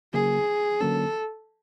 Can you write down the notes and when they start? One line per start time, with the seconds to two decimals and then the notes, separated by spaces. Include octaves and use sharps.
0.13 C#3 F#3 A#3 G#4
0.80 D3 F#3 A#3 C#4 A4